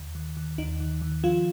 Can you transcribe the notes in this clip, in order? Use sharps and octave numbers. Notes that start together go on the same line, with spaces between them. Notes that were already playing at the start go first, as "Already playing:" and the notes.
Already playing: D#2 D3
D#3
D#3
D#2 D#4
D#3
D#3
F3 F4